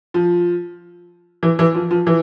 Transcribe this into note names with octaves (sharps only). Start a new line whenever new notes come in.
F3
E3
E3
F3
F3
E3